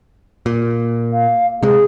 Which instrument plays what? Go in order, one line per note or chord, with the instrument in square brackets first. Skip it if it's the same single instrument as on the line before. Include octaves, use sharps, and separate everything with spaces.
[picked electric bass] A#2
[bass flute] F5
[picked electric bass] C3 G#3 [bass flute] G#4